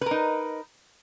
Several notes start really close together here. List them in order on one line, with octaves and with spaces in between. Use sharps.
B4 A#4 D#4